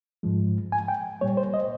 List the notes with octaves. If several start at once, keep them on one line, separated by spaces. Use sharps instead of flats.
G#2 F3 G#3
G#5
G5
A#2 G3 A#3 C#5
C5
D#5